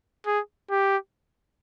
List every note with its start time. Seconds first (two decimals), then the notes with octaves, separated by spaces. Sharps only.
0.26 G#4
0.70 G4